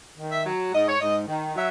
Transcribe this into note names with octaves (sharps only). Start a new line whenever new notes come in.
D#3
E5
F#3
G#2 D#5
C#5
G#2 D#5
D#3
F#3 E5